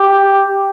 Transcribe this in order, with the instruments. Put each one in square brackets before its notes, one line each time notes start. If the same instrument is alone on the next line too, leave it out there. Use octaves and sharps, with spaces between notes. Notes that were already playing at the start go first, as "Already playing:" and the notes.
Already playing: [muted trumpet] G4